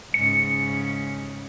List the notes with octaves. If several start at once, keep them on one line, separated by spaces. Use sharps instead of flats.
G#2 C#3 C#7